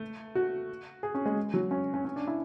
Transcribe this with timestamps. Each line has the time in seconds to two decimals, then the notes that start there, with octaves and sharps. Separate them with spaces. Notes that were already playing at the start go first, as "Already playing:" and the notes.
Already playing: A3
0.35 F#4
1.03 G#4
1.15 C#4
1.26 G#3
1.54 F#3
1.71 C#4
1.94 C#4
2.05 C#4
2.16 D4
2.27 E4